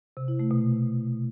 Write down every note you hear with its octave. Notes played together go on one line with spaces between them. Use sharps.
C3
E4
A3
B2